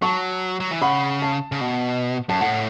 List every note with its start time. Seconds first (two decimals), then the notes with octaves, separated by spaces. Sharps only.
0.02 F#3 A5 C#6
0.60 F#3
0.71 E3
0.81 C#3 F#5 B5
1.22 A5
1.52 C#3
1.61 B2
2.29 F#2 A5
2.41 A2 F#5